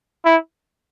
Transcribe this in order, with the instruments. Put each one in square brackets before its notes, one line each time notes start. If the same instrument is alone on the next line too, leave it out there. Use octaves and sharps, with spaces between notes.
[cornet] E4